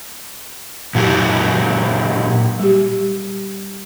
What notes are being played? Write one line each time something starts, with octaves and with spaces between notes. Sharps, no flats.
A#2 F#3 G4
G3 G4